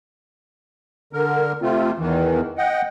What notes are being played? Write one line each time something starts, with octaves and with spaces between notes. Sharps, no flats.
D3 A#4
C3 A3 C4 F4
E2 D#3 E3
D#5 F#5 G5